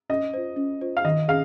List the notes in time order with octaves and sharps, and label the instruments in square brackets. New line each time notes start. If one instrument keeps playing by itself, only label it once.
[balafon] C#4 [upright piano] D#5
[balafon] F4 C5
C#4
F4 C5
[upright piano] F5
[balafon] D#3 [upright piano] D#5
[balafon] C#4 G#4 [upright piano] F5